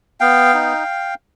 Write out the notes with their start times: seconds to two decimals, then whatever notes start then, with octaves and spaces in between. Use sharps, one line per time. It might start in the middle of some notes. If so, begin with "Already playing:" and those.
0.20 B3 F5 G5
0.54 D#4